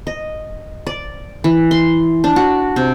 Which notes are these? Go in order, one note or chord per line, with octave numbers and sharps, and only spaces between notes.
D#5
D5
E3
C6
D4
F#4
C3